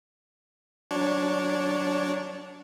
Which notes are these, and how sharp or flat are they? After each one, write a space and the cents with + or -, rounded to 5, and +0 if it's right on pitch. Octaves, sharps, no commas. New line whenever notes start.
F#3 +0 D4 -15 C#5 -10